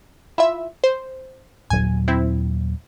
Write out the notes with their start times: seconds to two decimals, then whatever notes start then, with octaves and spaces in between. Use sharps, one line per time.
0.38 E4 F4 E5
0.84 C5
1.70 G1 D#2 A#2 F#3 G#5
2.08 C4 E4